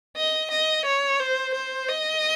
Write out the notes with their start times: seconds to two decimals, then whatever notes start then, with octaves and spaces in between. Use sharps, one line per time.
0.16 D#5
0.51 D#5
0.85 C#5
1.19 C5
1.54 C5
1.88 D#5